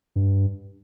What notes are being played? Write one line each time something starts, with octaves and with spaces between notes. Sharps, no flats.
G2